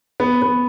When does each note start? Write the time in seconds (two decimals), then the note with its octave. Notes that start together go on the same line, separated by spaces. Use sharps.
0.20 B3
0.42 B3